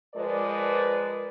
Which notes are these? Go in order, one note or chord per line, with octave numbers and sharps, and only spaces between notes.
F3 G#3 A#4 B4 D5